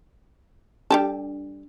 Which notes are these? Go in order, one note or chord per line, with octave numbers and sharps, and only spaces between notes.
G3 D4 G4 A4